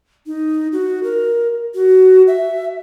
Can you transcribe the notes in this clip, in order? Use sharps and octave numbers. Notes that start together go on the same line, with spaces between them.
D#4
F#4
A#4
F#4
E5